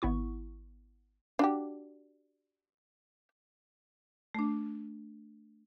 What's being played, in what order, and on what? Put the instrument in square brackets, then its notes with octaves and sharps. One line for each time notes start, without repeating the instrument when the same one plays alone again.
[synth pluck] G#1 B3 E4 C#6
[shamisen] D4 F#4 G4
[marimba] A3 D4